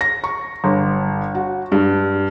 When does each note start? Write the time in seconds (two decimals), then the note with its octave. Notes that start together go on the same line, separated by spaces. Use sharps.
0.01 A#6
0.24 C#6
0.64 G1
1.35 F#4
1.72 G2